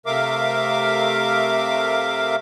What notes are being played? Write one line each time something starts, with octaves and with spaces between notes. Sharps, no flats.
C3 A3 A#4 E5 F5 D6